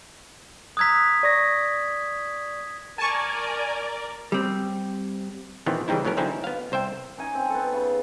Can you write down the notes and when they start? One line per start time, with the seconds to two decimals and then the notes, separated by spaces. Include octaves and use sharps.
0.77 A#5 D#6 E6 F#6 G#6 B6
1.23 D5 C#6 A#6
2.98 A#4 D5 G#5 A5 C#6
4.32 G3 C4
5.66 E2 A#2 D#3 E3 B3 C4
5.88 C#3 E3 G3 C4 D#4 E4
6.05 A2 F#3 B3 C#4 A#4
6.17 D3 F#3 C4 C#4 D#4 E4
6.44 B3 F5
6.72 C2 C5 E5 G5
7.18 C#4 D#4 G#5
7.35 C4
7.50 B3 A4
7.73 C#3